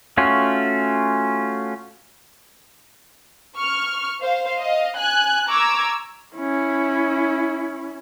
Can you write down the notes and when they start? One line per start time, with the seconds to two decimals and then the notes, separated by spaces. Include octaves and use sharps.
0.17 A3 C#4 F4 F#4
3.59 C#6 F6
4.21 C5 F5
4.60 D#5 F5
4.97 G#5 F#6
5.48 A#5 C#6 D6 E6 G#6
6.36 C#4 E4